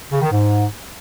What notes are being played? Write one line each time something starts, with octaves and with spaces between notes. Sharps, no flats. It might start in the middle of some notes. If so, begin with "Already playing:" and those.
C#3
D#3
G#2